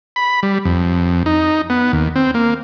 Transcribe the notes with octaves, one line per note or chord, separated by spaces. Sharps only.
B5
G3
F2
D#4
B3
D#2
C4
A#3